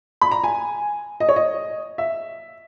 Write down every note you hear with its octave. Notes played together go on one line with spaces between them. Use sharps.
B5
A#5
G#5
D#5
C#5
D#5
E5